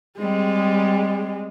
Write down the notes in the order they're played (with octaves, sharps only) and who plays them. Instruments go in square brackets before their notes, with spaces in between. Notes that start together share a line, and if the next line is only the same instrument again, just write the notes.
[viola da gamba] G3 C4 [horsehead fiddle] G#3